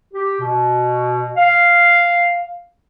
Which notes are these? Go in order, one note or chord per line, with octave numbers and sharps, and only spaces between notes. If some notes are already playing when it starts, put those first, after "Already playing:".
G4
B2
F5